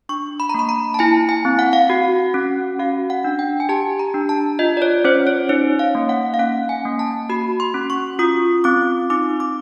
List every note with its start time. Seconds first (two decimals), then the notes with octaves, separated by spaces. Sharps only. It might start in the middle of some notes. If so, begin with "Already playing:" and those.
0.09 D4 C#6
0.40 B5
0.49 A#5
0.54 A#3 B5
0.69 A#5
0.94 A5
0.99 E4 G#5
1.29 G#5
1.45 C4
1.59 F#5
1.73 F5
1.87 F#4 F#5
2.34 C#4
2.79 F#4 F5
3.10 F#5
3.24 D4
3.39 G5
3.60 G#5
3.69 G4 A5
3.99 A#5
4.14 D4
4.29 A5
4.59 F4 D#5
4.77 D5
4.82 C#5
5.04 C#4 C5
5.27 C#5
5.49 D#4 C#5
5.79 F5
5.95 A#3
6.09 F#5
6.34 F5
6.39 C#4 F#5
6.69 G#5
6.85 A#3
6.99 A5
7.30 F#4 B5
7.60 C6
7.74 C#4
7.90 C#6
8.19 F4 D#6
8.64 C4 D6
9.10 D#4 D6
9.40 D6